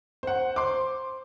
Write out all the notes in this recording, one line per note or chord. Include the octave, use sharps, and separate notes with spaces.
C5 F#5
C5 C6 D6